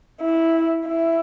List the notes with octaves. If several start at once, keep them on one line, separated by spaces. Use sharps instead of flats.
E4
E4